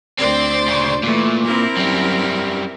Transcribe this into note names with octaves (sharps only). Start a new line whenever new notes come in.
D2 C4 C5 D5
A#2 C#3
A#2 E3 A3
C4 E4 A#4
F#2 G3